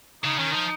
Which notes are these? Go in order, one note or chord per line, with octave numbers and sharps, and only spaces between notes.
C#3 D#4
D#3 C#4
F3 D#4